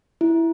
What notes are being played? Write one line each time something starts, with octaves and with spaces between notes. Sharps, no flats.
E4